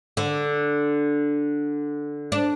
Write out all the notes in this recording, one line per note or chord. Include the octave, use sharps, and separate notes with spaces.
D3
D4